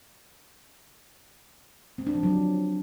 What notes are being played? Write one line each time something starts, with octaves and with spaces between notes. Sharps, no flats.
C4
D4
F3
F#3